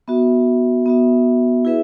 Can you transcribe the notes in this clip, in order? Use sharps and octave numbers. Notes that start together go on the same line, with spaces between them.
B3 F#4 E5
B3 F#4 E5
E4 G#4 B4 E5